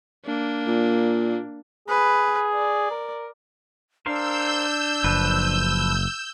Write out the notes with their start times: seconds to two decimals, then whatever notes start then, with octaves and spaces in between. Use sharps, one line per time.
0.25 A#3 D4
0.67 A#2
1.88 G#4 B4
2.53 D5
2.91 A#4
4.06 D4 A#4 C5 F5 E6 G6
5.04 F#1 F3 B4